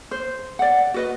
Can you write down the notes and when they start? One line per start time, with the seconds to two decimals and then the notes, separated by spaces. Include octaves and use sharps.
0.11 C5
0.59 D5 F#5
0.94 F#4 B4 D#5